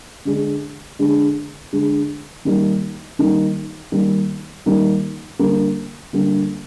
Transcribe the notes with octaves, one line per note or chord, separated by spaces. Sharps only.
D3 G#3 D4
D3 G#3 D4
D3 G#3 D4
D#3 G3 A#3 D#4
D#3 G3 A#3 D#4
D#3 G3 A#3 D#4
D#3 G3 A#3 D#4
D3 G3 A#3
D3 G3 A#3